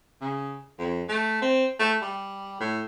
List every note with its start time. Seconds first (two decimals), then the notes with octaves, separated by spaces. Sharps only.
0.21 C#3
0.79 F2
1.09 A3
1.42 C4
1.79 A3
2.02 G3
2.60 A2